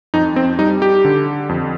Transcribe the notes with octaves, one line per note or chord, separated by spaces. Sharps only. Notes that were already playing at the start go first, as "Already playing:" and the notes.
F2 D#4
C4
G3 D#4
G4
D3
F2